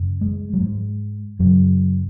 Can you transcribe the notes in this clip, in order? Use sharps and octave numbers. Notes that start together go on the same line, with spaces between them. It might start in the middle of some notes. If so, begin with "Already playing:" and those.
Already playing: F#2 C#3
G#3
F#3
G#2 G#3
F#2 C#3 F#3